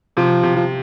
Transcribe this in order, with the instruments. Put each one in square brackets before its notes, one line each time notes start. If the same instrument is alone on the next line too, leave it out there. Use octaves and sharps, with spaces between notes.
[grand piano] C3 [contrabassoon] F3
[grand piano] C3
[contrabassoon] F3